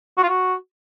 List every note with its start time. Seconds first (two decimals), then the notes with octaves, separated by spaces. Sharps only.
0.18 F#4
0.23 F4
0.29 F#4